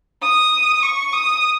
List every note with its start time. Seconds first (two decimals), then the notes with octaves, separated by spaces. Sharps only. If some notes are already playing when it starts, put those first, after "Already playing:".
0.23 D#6
0.82 C#6
1.13 D#6